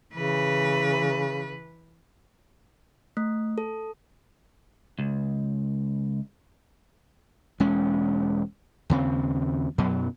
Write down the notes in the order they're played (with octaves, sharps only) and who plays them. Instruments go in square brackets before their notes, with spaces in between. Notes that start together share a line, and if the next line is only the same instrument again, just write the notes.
[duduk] C#3 [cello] E3 B4
[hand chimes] A3
A4
[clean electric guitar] C#2
[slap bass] E1 G#3 C#4
D#2 C#3 C4
F#2 B2 F#3